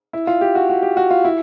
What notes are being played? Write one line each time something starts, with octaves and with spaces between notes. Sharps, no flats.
E4
F4
G4
F#4
F#4
G4
F#4
F4
E4